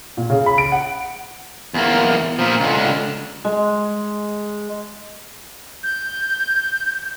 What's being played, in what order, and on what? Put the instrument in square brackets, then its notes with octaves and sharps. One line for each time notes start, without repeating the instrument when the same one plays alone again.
[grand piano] A#2
C#3
B5
D7
F#5
[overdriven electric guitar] E2 A#3
A#2 F3
C#2 D3
[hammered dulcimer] G#3
[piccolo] G6